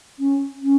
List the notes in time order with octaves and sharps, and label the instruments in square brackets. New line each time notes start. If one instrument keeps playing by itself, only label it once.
[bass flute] C#4
C#4